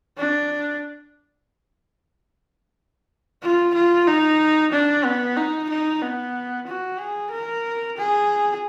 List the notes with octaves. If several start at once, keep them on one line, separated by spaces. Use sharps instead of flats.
D4
F4
F4
D#4
D4
B3
D#4
D#4
B3
F#4
G#4
A#4
G#4